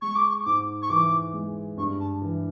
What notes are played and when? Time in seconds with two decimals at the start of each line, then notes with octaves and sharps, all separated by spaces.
0.02 G#3 C#6
0.15 D6
0.27 C#6
0.46 G#2 D6
0.82 C#6
0.90 E3 D6
1.34 G#3
1.77 G2 C#6
2.00 A5
2.22 E3